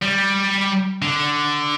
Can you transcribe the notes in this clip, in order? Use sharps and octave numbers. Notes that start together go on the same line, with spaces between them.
G3
D3